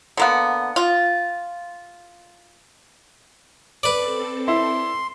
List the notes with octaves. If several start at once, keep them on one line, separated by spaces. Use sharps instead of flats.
D3 A#3 B3
F4
C4 A4 B4 D5
E4 C6